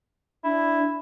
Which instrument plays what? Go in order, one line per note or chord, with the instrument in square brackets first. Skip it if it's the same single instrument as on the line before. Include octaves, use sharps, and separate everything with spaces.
[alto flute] D4 [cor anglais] E4